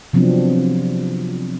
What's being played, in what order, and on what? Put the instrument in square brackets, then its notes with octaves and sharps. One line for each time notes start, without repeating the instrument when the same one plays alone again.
[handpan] C3 F3 F#3 B3 C4 D4